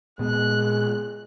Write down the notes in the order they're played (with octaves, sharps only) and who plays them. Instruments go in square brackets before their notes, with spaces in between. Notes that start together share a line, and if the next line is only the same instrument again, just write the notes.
[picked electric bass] A#2 B3 [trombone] G#3 [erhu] F#6